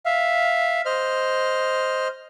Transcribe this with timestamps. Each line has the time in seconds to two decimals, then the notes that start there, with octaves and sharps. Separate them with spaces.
0.06 E5 F5
0.85 C5 D#5 F6